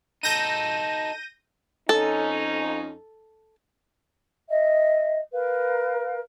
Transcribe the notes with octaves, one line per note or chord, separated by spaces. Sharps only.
D#4 A4 G6 A#6 D#7
F2 C#4 D#4 A4
D#5 E5
A#4 B4 F5